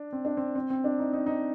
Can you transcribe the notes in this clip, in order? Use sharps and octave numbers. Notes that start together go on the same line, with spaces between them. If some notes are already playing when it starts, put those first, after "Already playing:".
Already playing: D4
C4
D4
C4
C4
C4
D4
D#4
D#4
D#4